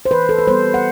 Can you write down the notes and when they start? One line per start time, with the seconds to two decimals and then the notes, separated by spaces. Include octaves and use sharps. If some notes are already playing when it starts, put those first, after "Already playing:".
0.05 C5
0.11 E3 B4
0.29 A4
0.39 B4
0.47 G3 B3 C5
0.74 F#5